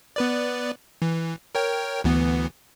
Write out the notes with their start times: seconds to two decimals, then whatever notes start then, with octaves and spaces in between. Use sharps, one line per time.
0.16 B3 B4 D5
1.02 E3
1.55 A#4 C#5 G5
2.04 D2 E3 B3